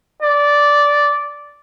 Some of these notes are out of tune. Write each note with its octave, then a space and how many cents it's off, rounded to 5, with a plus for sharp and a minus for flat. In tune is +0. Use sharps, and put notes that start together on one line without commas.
D5 -10